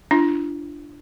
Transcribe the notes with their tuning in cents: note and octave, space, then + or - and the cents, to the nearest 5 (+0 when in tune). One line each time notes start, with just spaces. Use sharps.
D4 +0 F4 -40